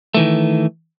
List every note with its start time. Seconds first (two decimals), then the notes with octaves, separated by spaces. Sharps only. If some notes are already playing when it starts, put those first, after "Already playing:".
0.14 D#3 E3 A3